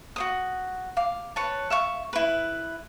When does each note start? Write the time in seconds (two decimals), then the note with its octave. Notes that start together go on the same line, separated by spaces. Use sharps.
0.16 F#4 C5 D#6
0.97 F5 D6
1.36 B4 C#5 A5
1.70 E5 F5 C#6
2.13 E4 B4